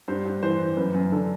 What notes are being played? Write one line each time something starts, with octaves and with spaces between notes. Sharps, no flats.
G2 C5
G2
E3 C5
E3
F#2 B4
F#2
D3 A4